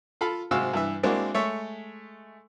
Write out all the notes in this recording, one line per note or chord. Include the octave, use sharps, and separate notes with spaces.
F4 A4 F5 B5
G#2 C3 G#3 F#4 F5 E6
G2 E3 E5
G#3 A#3 C4 D4 E4 F#4
G#3 A3 C#5 E5